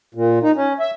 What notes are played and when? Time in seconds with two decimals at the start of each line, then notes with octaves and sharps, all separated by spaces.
0.15 A#2
0.43 D#4
0.56 C#4
0.80 E5